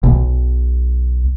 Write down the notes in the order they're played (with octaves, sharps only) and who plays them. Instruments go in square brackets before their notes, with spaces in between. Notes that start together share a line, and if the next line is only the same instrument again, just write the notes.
[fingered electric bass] B1